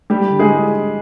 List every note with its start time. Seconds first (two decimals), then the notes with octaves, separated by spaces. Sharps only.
0.10 G3 G4
0.30 D3
0.39 G#3 G#4